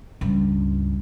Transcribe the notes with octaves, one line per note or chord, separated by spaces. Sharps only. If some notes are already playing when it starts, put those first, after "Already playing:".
C#2 G2